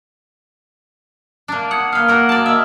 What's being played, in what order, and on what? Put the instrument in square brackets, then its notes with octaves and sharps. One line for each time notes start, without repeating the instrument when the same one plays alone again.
[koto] A#3 D4
[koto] F#5 [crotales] D#6 G#6
[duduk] A#3 [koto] B4 F5 [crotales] F6
[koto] F#4 A#4 [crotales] E6
[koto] D5 A5
G#3 E5